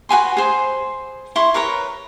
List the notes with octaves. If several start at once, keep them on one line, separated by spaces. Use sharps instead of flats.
F#4 B4 G#5 C6
G#4 C5
E4 C6 C#6
A#4 B4 C#5 A#5